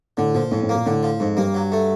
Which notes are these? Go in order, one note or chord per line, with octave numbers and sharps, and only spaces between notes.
A2 D3
A#2 F3
F2 A2
A2
A#3
A#2
A2 D3
F3
F2 G#2
G2 A#3
F#3
A3